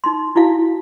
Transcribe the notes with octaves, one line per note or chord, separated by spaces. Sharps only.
D#4 C6
D#4 E4 F#4 F5